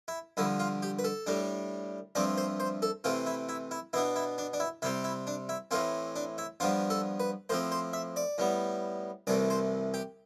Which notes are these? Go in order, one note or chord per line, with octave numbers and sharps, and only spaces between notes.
E4
G2 D3 F3 E4
F4
G4
B4
A4
A2 G3 D4
G2 F3 A3 C4 D5
C5
C5
A4
C3 E3 A3 C4 F4
E4
E4
E4
B2 B3 D4 E4
E4
D4
D4
E4
C3 G3 C4 E4
E4
D4
E4
A2 E3 A3 C4 F4
D4
E4
G2 F3 B3 D4 F4
A4
B4
A2 F3 C4 C5
C5
E5
D5
A2 G3 B3
C2 C3 E3 A3 D5
C5
G4